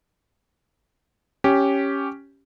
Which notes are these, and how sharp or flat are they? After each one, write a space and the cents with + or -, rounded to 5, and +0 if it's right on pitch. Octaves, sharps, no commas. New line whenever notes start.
C#4 +0 G4 -5